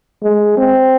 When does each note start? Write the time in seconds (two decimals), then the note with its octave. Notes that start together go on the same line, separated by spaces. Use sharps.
0.23 G#3
0.57 C4